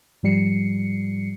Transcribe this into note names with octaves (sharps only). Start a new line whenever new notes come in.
G#2 F3 G3 C7 C#7